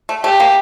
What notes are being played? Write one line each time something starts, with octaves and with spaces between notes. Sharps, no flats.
A3
A3 G4
A#3